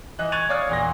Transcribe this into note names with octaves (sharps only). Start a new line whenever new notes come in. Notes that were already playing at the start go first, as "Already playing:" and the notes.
E3 D#5 F#6
C#6 F#6 G#6 A6 D#7 F7
C#5 D5 F5 D6 D#6 F6
E2 A#2 A#6